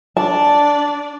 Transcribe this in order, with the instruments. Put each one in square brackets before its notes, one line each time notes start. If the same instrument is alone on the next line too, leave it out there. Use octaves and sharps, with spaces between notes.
[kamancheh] D4 D5 [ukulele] A5